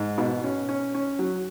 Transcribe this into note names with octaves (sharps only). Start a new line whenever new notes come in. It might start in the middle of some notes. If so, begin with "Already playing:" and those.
Already playing: G#2
B2
C#4
C#4
C#4
F#3